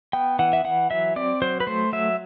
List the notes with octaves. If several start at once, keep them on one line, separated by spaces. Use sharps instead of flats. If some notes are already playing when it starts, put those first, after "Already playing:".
B3 G5
E3 F#5
E5
E3 F#5
F#3 E5
C4 D5
F#3 C5
B4
A3 C5
F#3 E5